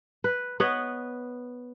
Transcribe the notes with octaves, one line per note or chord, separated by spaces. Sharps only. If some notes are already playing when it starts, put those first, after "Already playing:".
B4
B3 B4 C#5 D#5